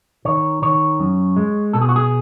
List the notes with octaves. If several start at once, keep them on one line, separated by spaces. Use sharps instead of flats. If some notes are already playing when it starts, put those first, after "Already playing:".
D#3 C#5
D#3 C#5
F#2
G#3
B2 A4
G#4
F#4
G#4